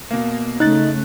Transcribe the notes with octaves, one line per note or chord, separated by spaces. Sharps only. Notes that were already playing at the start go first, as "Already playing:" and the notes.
B2 A#3
C#3 A3 D#4 F#6 A6